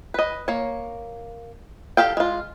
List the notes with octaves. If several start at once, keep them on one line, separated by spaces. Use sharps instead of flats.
B4 D#5
A#3 C#5
G4 A4 F5 G5
G#3 F4